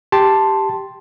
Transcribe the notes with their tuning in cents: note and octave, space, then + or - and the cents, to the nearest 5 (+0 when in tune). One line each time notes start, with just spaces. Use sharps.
G4 +0 A5 +0 C6 +0